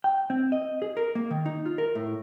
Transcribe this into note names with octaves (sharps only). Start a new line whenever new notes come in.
G5
C4
D#5
G#4
A#4
A#3
D#3
D#4
F4
A#4
A2